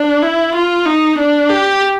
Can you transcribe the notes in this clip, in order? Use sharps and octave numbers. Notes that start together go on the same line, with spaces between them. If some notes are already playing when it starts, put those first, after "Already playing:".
Already playing: D4
E4
F4
D#4
D4
G4